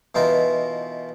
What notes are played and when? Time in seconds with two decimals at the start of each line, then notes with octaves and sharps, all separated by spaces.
0.15 B2 E3 D#4 F4 A#4